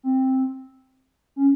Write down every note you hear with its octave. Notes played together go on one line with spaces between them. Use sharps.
C4
C#4